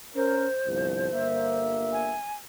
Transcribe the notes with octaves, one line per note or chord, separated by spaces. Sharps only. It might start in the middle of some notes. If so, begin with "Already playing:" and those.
C#4 A#4 C5
G1 C2 F3
G1 A#3 E5
G#5